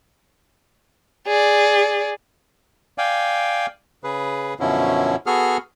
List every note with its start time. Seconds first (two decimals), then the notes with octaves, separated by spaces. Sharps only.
1.27 G#4 D5
2.98 D5 F5 G5 G#5
4.04 C#3 G#4 B4
4.60 F#2 B2 D3 F3 C#4 E4
5.26 B3 F#4 G#4 A4 F6